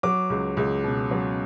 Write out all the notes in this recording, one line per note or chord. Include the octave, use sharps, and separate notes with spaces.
F#3 D6
C#2
C#2
B2
F#3